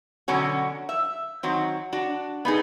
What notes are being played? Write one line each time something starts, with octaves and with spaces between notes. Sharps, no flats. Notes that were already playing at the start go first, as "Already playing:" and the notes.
B2 D3 F#3 C#4 F#4
E5
D#3 F#3 C4
D4 F#4
B3 D#4 G#4 A4